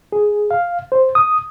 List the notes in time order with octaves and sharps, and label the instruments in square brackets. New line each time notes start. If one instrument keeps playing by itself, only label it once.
[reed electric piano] G#4
F5
C5
D#6